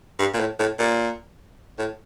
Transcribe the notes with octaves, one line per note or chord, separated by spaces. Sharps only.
G2
A#2
A2
A2
A#2
A2